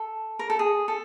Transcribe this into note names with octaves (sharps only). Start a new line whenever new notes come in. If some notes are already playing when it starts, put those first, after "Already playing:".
Already playing: A4
A#4
A4
G#4
A4